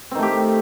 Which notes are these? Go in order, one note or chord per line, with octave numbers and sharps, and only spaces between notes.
D#3 A3 C4 G4